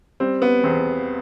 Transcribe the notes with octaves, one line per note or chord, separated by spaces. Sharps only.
G3 C4
B3
E2 C4